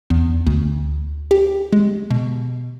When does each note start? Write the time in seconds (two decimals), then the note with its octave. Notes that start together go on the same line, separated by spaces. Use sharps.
0.10 E2
0.47 D2
1.31 G4
1.73 G#3
2.11 B2